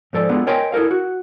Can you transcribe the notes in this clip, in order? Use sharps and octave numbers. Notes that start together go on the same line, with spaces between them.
G#2 F3 A4 D5
G#3 A3 B3 D4 F4
A#4 C#5 D#5 G5 G#5 C6
E4 A4 A#4 F5
F#4